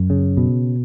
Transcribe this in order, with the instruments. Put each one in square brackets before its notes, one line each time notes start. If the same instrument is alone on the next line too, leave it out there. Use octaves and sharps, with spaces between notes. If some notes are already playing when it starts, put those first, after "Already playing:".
Already playing: [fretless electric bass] F#2
C#3
B2